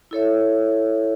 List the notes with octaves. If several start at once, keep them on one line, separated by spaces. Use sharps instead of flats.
E4 A4 C#5 E5